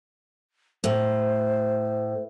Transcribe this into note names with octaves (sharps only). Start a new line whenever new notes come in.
A2 C5